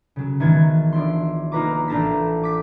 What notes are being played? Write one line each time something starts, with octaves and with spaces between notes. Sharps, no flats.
C#3 F#3
G#1 D#3 E3 B3 G#6 A6
F3 D4 E4 C6
A#3 D#4 F4 B4 A#5 D6
A1 A3 D4 A5 A#5 B6
D6 B6